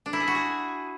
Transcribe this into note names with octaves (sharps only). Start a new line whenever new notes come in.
D4
E4
G#4
F#4
G#4